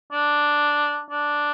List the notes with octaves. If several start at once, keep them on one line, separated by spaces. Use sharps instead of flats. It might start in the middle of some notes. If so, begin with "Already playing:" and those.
D4
D4